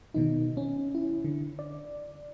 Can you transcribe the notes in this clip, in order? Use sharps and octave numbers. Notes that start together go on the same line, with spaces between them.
B2 D#3 D#4
C#4
E4
D3
D5